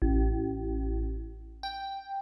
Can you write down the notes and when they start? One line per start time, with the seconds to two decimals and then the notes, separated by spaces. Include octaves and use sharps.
0.02 A1
1.63 G5